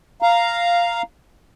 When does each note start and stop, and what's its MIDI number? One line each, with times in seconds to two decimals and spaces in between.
0.22 1.02 77
0.22 1.02 82